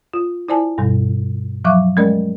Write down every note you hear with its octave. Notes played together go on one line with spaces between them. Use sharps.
F4
E4 C5 D5 G#5 A5
G2 B2 G3
F3 F#3 E5 F5 C#6 D6
G#3 A3 C#4 A#4 D5 D#5